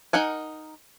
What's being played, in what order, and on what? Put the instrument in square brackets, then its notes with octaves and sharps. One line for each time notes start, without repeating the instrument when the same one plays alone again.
[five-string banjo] D#4 A#4 F#5 G#5